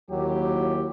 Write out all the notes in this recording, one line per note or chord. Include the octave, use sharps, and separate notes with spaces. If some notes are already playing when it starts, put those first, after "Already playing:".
D#2 F#3 E4 G4